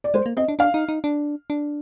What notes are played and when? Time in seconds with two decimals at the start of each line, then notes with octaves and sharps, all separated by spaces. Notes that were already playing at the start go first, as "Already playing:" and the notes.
0.04 D5
0.14 G#3 C5
0.26 A#3
0.37 C4 D#5
0.48 D4
0.59 D4 F5
0.74 D#4
0.89 D#4
1.04 D4
1.50 D4